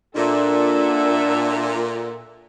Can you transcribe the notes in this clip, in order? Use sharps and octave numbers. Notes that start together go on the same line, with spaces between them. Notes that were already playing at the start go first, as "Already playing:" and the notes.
A#2 D4 A4 E5 F#5